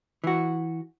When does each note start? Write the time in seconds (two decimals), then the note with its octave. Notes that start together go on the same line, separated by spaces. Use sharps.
0.24 E3 F#4